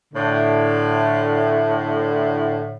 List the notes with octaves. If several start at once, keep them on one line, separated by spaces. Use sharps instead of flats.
A2 D3